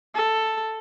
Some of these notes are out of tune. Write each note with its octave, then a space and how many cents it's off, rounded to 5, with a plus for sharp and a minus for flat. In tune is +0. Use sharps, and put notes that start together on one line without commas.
A4 +5